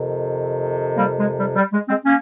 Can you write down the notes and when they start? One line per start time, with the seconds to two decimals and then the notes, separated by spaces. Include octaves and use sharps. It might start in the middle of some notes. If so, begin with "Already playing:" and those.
Already playing: F2 C3 D#3
0.97 G3 A#3
1.18 G#3
1.40 G3
1.56 G3
1.72 G#3
1.88 G#3 C4
2.04 A#3 C#4